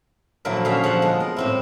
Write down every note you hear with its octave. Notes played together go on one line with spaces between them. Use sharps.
A#2 D3 F3 F#3 E4 A#4
D3 C#4 G#4 E5 F5 A#5
F3 C5 F#5
G#3 B3
A#4
A2 C4 E4